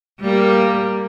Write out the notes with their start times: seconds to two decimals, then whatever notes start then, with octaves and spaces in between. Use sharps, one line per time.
0.20 G3 A#3